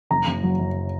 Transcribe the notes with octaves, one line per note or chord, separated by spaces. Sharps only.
F#1 A#5
F#1
F#3
F#2